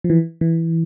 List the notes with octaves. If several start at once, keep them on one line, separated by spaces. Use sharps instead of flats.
F3
E3
E3